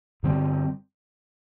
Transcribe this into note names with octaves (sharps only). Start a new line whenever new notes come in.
G2 D3 G3 C4